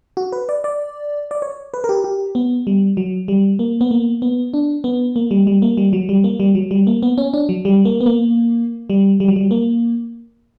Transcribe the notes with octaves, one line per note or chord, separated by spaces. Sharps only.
F#4
B4
D5
D5
D5
C#5
B4
A#4
G4
G4
B3
G3
F#3
G3
A#3
B3
A#3
B3
D4
B3
A#3
G3
G3
A#3
G3
F#3
G3
A#3
G3
F#3
G3
A#3
B3
C#4
D4
F#3
G3
A#3
B3
A#3
G3
G3
F#3
G3
A#3